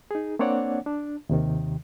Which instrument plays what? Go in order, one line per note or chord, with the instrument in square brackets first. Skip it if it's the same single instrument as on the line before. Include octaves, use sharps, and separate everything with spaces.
[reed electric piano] D#4 G#4
A#3 C4 D4 C#5 D5 F#5
D4
D#2 C3 D#3